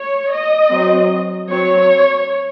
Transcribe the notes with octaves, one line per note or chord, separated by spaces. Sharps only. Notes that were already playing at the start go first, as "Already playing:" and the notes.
Already playing: C#5
D#5
F#3 C4
F#3 C4 C#5